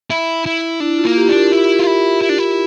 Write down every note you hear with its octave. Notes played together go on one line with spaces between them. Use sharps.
E4
E4
D4 E4
F4
A#3
G4
D4
A#4
E4
F4
E4
E4
D4
E4